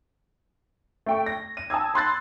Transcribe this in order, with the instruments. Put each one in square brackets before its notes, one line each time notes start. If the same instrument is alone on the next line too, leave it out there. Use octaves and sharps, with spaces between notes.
[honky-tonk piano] A3 G5 C#6
A#6
D#7
A5 D#6 E6 G#6
B5 C6 F#6 A6